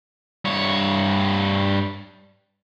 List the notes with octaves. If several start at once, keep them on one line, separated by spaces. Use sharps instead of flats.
G2 C#5